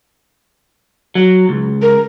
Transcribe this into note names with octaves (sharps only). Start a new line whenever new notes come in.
F#3
C#2
A#4